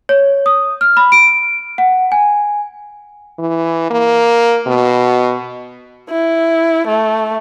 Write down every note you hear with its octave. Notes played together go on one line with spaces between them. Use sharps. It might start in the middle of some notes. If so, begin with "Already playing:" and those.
C#5
D#6
F6
B5
D7
F#5
G#5
E3
A#3
B2
E4
A3